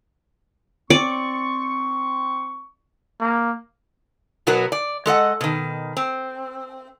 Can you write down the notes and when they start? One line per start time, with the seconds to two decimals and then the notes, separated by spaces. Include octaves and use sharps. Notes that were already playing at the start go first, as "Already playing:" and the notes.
0.90 C4 D5 C#6
3.21 A#3
4.47 B2 F#3 B3 F#4 A#4
4.72 D5
5.06 G#3 A4 D#5 F#5
5.41 B2 D#3
5.97 C4